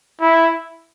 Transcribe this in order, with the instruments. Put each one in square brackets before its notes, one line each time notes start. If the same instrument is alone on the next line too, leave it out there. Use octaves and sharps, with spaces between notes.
[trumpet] E4